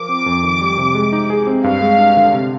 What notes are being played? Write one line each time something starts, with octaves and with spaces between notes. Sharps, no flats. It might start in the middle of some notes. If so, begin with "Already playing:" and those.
Already playing: F3 A#4 D6
C4
F2
D#3
G3
C3
G#3
D#4
G#4
C4
G2 F5
G#3
D4
D3
C3